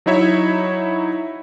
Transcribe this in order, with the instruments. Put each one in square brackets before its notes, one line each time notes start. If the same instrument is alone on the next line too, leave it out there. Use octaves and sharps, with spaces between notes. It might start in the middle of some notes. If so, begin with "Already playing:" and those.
[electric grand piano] F#3 D#4 E4 C#5 E5